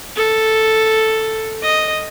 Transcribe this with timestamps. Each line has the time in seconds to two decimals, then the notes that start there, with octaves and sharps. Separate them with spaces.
0.16 A4
1.63 D#5